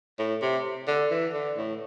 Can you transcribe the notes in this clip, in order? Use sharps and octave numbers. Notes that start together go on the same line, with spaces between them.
A2
C3
D3
E3
D3
A2